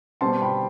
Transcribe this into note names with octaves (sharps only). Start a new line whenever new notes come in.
B2 G3 C4 A5 C6
G5 B5